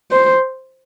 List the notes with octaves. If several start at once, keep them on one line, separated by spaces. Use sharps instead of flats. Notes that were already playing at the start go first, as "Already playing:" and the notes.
C5